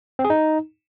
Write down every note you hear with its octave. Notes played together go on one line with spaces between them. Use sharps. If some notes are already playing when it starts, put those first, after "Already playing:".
C4
G#4
D#4